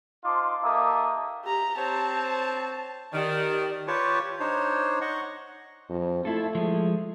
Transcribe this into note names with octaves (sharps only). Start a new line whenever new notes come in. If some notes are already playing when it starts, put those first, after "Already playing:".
D#4 F4 C5 A5 C6 D6
A#3 D#4 G4 A4 E5 D#6
G4 A#5
C4 C5 C#5 A5
D#3 G4 D5
F4 G4 B4 C#5 A5 C#6
D4 D#4 C5 C#5
D#5 F#5 C#6
F2
A3 E4 F4 A4
F3 G#3